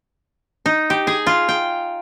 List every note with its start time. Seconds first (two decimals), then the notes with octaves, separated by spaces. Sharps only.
0.66 D#4
0.90 G4
1.07 G#4
1.27 F4
1.49 G5